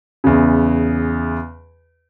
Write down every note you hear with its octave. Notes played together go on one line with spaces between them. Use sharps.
E2 C#3